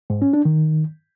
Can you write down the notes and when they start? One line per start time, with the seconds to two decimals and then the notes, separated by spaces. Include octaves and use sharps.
0.10 G#2
0.22 C#4
0.33 D4
0.45 D#3